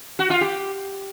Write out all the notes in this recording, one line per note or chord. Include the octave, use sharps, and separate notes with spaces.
F#4
F4
G4